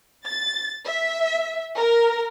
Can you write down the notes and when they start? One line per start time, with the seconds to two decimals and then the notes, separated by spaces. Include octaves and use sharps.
0.24 A6
0.86 E5
1.78 A#4